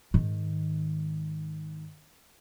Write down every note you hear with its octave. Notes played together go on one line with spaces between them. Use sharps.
G#2 D#3